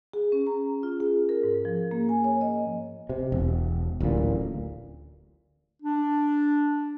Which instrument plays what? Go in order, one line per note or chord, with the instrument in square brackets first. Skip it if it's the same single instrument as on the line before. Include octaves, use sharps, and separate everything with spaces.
[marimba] G#4
C#4
A#5
F4
G#4
A#4
G#2
F3
A#3
G#5
C#5
D#5
[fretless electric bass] C3
E1
D1 A1 D2 A#2
[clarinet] D4